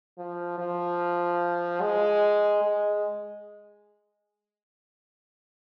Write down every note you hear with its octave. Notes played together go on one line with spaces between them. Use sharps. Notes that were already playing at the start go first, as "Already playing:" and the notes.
F3
F3
G#3
G#3